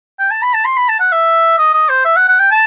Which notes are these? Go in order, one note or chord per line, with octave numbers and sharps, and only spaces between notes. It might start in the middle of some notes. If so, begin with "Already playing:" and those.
G5
A5
B5
A5
C6
B5
A5
F#5
E5
D#5
D#5
C5
E5
F#5
F#5
G5
A5